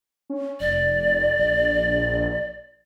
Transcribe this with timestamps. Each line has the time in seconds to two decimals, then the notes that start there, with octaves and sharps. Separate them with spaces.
0.30 C#4
0.60 F1 D5
1.39 A#1